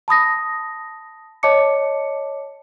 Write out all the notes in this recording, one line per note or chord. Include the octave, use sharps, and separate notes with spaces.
A5 B5 D#6 A#6
C#5 D#5 A5 D6 C#7